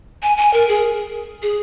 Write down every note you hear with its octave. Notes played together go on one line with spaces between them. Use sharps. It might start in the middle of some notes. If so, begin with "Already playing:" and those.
G#5
G#5
A#4
G#4
G#4